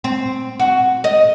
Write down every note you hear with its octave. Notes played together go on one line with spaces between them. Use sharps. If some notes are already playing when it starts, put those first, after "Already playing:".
C4
F#4
D#5